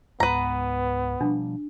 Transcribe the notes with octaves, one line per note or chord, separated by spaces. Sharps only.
C#2 G#2 G#3 B3 B4 A#5
B2 F3 G3 D4